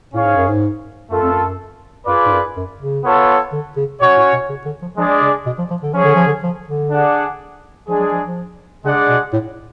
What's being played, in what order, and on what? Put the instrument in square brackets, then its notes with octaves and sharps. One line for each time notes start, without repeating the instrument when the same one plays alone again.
[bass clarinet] A2 [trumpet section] C#4 G#4 C#5 F5
[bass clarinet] G#2
F#2
G#2
[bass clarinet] F#2 [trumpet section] A3 F4 A4
[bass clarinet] F2
F#2
[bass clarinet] F#2 [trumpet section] F4 G#4 B4 D5
[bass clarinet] G#2
F#2
F#2
C#3
[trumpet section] B3 F4 A4 C#5
[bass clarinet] D3
C#3
[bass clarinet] B2 [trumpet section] C#4 F#4 C#5
[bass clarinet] A2
B2
C#3
D3
F3
[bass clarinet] F3 [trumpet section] G#3 D4 G#4 D5
[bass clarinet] C#3
B2
F3
F3
D3
[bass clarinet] F3 [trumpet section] C#4 G#4 C#5
[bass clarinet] D3
F3
D3
F3
D3
[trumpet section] D4 G#4 D5 F#5
[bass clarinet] F3 [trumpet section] G#3 D4 G#4
[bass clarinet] F#3
F3
F3
[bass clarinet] C#3 [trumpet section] G#3 D4 G#4 D5 F#5
[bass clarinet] B2
A2